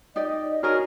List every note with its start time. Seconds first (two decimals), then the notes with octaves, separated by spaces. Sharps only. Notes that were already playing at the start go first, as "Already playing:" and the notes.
0.16 D#4 G4 D5 D#5
0.63 D#4 F#4 G#4 A#4 C#5 D#5 F6